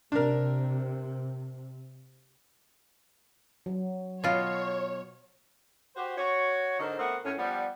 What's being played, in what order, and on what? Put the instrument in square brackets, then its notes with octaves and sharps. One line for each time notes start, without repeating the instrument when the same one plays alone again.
[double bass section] C3 [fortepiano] D4 A#4
[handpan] F#3
[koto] B2 F4 [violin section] C#5
[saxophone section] F#4 G4 C5
F#4 C#5
G#2 D3 D#4 F#4 A#4 C5
A3 B3 C4 F#4 A#4 F#5
A2 A3 C#4
F3 G3 B3